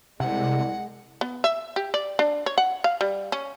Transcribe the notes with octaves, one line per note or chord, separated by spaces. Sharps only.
C2 C3 G#3 F#5
B3
E5
G4
D5
D4
C#5
F#5
F5
G3
C#4